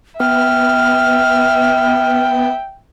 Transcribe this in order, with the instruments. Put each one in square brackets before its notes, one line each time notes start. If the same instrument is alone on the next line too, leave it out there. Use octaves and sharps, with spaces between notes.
[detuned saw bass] B3 [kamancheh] E5 [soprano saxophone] G5 [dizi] F6